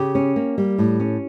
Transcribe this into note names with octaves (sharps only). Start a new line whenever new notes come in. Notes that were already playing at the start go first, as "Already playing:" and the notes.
Already playing: C#3 G4
C#4
A#3
G3
A2
C#4